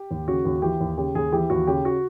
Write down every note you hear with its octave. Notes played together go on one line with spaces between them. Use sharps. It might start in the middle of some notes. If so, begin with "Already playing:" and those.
Already playing: G4
D#2
C#3 F#4
D#2
E3 G4
D#2
C#3 G4
D#2 G#4
E3 G4
D#2 F#4
C#3 G4
F#4